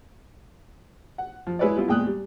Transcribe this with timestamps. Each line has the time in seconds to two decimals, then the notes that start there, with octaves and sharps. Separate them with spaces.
1.18 F#5
1.47 F3
1.59 G#3 E4 B4 C#5 D5
1.76 G3 B3 E4 F4
1.88 E2 A#2 G#3 G5 D#6 F#6
2.07 G3